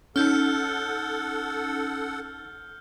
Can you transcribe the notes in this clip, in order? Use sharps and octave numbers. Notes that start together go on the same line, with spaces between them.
C#4 D#4 A4 F#5 F6 G6